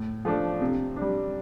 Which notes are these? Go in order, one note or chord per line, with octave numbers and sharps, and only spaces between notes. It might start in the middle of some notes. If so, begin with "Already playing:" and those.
Already playing: A2
F3 A3 D4
C3
D4
G3